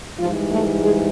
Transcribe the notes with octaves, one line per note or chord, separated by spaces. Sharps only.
G#2 E3 F3 G3 F4
A3 A4
G#3 G#4